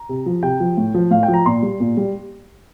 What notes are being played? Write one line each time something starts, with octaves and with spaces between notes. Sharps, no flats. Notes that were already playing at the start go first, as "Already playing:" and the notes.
Already playing: A#5
C3
F3
C3 G5
F3
A2
F3
A2 F5
G5
F3
A#5
A#2 C6
G3
A#2
G3